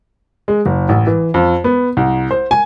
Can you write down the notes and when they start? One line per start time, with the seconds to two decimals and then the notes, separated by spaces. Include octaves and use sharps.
0.48 G#3
0.66 F#1
0.89 A1
1.07 E3
1.34 F2
1.64 B3
1.97 C2
2.31 C5
2.51 G#5